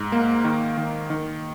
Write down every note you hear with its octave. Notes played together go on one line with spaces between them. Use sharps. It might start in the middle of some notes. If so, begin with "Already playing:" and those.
Already playing: G#2
A#3
D#3
D#3
D#3